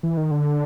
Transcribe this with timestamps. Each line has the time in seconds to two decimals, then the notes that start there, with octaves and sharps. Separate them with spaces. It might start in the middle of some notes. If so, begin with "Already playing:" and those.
0.03 E3
0.17 D#3
0.31 D3